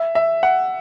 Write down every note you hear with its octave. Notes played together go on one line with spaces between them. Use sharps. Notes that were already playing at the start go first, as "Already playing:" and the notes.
Already playing: E5
E5
F#5